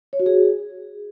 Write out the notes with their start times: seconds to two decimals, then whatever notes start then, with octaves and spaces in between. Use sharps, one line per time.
0.13 C#5
0.20 F#4
0.26 G#4